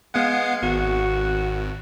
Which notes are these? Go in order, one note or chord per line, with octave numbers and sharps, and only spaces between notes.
G#3 B3 F5 F#5
G#1 F#4